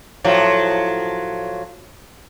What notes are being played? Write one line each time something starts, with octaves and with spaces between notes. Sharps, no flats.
A2 F3 F#3